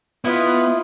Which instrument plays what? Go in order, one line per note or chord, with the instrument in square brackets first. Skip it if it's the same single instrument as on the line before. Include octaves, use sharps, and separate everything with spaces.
[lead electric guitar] B3 [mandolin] E4 D#5 [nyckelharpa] F4